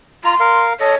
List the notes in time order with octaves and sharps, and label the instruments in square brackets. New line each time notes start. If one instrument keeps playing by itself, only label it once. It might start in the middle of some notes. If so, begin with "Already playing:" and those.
[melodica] F4 A#5 [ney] C6
[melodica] A#4 F5
[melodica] A4 D#5 [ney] C#5